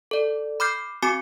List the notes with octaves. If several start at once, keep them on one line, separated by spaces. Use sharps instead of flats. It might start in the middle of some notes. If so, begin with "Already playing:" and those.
A4 D5
B5 D6 F6 G6 C7
C4 F#4 G#5 D6 C#7